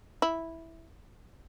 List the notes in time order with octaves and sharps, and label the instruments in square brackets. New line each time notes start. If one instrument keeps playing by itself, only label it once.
[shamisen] E4